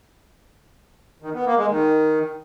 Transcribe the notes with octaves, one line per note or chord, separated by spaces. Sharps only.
D#3
B3
A#3
G#3
D#3